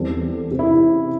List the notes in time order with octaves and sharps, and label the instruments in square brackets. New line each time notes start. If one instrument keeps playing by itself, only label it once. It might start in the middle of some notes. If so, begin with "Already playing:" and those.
Already playing: [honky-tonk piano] E2 E3 G3 C4 A4
C3 E3 C4 G4
[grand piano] E4